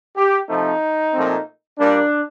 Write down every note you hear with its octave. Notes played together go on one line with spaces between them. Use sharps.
G4
C3 F3 A3 C4 D#4
A#2 F3 A3 C4
A#2 G3 A#3 D4